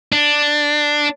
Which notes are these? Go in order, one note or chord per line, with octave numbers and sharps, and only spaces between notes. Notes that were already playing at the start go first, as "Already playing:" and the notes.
D4